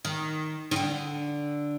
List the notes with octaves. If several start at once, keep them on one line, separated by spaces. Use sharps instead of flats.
D#3
D#3
D3